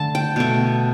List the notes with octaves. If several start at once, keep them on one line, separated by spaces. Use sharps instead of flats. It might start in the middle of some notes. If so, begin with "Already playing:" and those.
Already playing: D3 A3 A5
G5
B2 A3